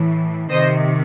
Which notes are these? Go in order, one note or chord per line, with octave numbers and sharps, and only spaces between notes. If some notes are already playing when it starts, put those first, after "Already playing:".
Already playing: A2 E3
C3 D#3 C5 D#5